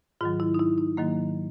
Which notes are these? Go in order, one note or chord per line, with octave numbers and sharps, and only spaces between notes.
G#2 D#3 F#3 F4
E4
D#4
E4
D#4
G#2 D#3 F#3 A#3